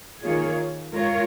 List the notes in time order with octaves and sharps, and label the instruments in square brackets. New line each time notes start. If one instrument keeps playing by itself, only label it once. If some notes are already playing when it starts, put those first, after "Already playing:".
[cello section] D#3 A#3 F4 G#4 C#5
G#3 F4 A#4 C#5